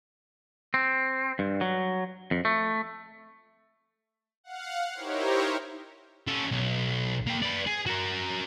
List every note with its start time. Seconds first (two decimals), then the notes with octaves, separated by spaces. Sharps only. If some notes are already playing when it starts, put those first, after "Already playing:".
0.74 C4
1.39 G2
1.61 F#3
2.31 F2
2.45 A3
4.44 F5 F#5
4.94 D#4 E4 G4 A#4 C5 C#5
6.27 C#4 A4
6.51 B1
7.27 A#3 G5
7.42 B4 D5
7.66 G#4
7.86 F#4 A#4